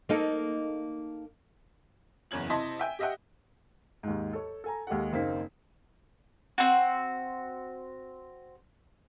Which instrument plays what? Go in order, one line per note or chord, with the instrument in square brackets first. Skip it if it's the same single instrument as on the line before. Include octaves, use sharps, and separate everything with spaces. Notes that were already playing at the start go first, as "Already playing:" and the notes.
[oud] A#3 D#4 A4
[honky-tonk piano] F#1 E2 C#3 G#6 F#7
C3 E4 D#5 A5 C6 B6
E5 G5 G#5
G4 D#5 E5 F#5 G5
[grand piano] D#2 G#2
A4 C#5
A4 G#5 A#5
D#2 G#3 G4 A4 F#5
F#1 D#3 A#3 C4 D#4 B6
[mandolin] C4 F#4